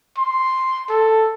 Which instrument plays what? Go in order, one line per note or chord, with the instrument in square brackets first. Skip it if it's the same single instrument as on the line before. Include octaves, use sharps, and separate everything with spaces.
[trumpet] C6
A4